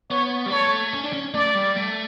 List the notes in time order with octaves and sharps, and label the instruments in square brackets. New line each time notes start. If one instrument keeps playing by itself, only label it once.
[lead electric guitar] B3 [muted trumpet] C#5
[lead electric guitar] G3
[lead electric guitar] A3 [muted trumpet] C#5
[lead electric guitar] C#4
D4
C#4
[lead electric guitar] A3 [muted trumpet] D5
[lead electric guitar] G3
A3